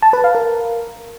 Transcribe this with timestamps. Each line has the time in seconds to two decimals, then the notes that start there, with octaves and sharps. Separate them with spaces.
0.02 A5
0.13 B4
0.24 F5
0.35 A#4